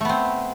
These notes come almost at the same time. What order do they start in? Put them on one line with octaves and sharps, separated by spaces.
A3 B3 C4